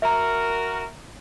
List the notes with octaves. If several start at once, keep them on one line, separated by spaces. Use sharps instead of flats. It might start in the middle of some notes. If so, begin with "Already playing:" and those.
F#4 A#4 E5 A#5